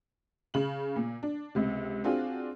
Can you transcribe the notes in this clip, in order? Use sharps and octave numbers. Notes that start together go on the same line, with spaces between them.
C#3 F#7
A#2
D4
C#2 C3
C4 D4 F4 F#4 G#4